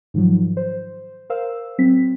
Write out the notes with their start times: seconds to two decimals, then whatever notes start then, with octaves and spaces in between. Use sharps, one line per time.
0.14 G#2 D#3 F3 F#3
0.57 C5
1.30 A#4 C5 F5 E6
1.78 F#3 C4 B6